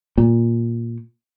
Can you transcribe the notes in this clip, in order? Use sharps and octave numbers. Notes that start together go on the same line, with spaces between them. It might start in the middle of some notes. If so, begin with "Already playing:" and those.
A#2